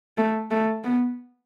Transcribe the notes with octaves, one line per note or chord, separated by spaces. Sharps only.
A3
A3
B3